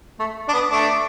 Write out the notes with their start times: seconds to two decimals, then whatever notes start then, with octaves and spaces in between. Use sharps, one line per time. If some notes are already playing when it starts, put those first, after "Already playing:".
0.19 A3
0.49 D4
0.53 B3
0.71 A3 D4